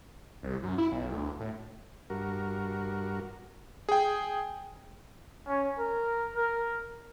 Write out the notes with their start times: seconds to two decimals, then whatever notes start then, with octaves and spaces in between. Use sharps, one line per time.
0.43 C2
0.63 F#2
0.78 E4
0.91 B1
1.12 D2
1.40 A2
2.10 G2 F#4 A#4
3.89 G#4 G5
5.47 C#4
5.79 A#4
6.36 A#4